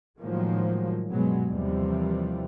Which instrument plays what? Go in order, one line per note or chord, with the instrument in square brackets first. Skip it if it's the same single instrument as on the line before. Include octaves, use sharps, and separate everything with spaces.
[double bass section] A2 D#3 F3 F#3 G#3 A#3
G2 B2 F#3 G#3 B3
D#2 C3 E3 F3 G3